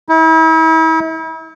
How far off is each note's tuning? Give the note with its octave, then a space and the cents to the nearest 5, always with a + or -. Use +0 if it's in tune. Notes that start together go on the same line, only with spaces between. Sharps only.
E4 -40